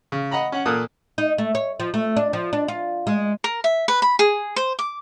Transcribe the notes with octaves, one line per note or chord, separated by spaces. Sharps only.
C#3
D#5 F#5 A#5 B5
C#4 F#5
A#2 A#3 A4 D#6 F#6
D#4
A3
C#5
F3
A3
D4
F3
D4
F4
G#3
A#4
E5
B4
B5
G#4
C5
D6